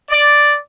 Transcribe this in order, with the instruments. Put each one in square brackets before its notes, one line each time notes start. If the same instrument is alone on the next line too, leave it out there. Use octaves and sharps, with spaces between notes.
[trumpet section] D5